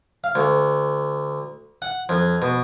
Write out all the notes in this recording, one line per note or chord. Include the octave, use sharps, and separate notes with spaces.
F5
D2
F#5
F2
B2